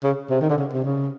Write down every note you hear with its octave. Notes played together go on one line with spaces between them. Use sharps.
C#3
C3
D#3
D3
C#3
C3
C#3